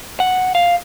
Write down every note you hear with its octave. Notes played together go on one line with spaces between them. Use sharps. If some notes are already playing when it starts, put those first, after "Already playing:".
F#5
F5